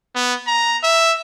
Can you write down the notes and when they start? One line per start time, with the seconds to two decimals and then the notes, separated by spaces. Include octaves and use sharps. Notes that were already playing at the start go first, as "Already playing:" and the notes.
0.15 B3
0.47 A#5
0.83 E5